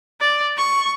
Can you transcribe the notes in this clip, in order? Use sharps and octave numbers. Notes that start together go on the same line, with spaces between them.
D5
C#6